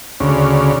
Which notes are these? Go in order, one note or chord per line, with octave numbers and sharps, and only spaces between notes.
D2 C#3